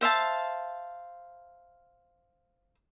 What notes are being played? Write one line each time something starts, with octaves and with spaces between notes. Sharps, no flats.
C5 E5 F5 A5